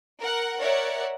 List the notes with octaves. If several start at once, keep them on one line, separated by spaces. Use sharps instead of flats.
A#4 F#5
A#4 C#5 D5 E5 F#5